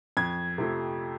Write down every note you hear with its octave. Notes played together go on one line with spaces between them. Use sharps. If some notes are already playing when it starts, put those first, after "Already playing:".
F2 G#6
C3 F3 A3